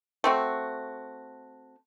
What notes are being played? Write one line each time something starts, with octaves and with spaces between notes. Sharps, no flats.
A3 C4 F#4